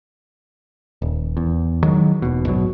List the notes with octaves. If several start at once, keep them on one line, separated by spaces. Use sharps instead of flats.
D#1
E2
D#3 F#3 G#3
E1 D#2 B2
A#1 G#2 B2 F#3